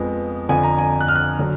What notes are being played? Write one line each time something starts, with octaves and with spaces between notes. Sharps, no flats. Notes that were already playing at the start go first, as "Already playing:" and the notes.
Already playing: F2 F3 G#3 B3
F2 D3 F3 G#5
A#5
G#5
F#6
F6
F#6
D3 F#3